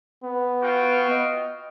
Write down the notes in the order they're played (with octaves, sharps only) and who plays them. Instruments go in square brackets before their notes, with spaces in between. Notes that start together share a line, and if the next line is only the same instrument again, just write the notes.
[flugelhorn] B3
[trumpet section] F4 F#4 G5
[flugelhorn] D#5